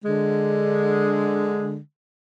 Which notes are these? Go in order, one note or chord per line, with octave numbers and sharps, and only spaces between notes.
D3 G#3